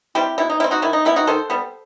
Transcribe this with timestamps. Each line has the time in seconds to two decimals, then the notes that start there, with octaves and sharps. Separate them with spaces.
0.15 G3 C4 E4 G4
0.38 B2 E4
0.49 D#4
0.60 G3 C4 E4
0.71 D#4 F#4
0.82 D#3 E4
0.93 D#4
1.05 G3 B3 E4
1.16 D#4 F#4
1.27 D#3 A4 C5
1.50 G3 B3